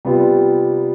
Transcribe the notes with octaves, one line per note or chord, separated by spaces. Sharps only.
C3 G3 B3 F4